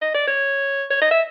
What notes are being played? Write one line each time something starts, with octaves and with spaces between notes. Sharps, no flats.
D#5
D5
C#5
C#5
D#5
E5